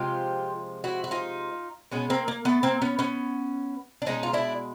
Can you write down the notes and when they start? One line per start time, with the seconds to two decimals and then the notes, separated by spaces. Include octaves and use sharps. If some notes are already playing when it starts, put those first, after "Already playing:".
Already playing: C3 F3 G#3 F4 G4
0.84 E4 F#4
1.04 F#4
1.11 D#4 F4
1.91 B2 G#3 B3 C#4
2.10 A#3 C4
2.28 A#3
2.45 A3 B3
2.63 A#3 C4
2.82 B3 C#4
2.99 B3 C#4
4.02 D4
4.06 B2 G#3 C#4 D#4
4.23 F4
4.33 D4 E4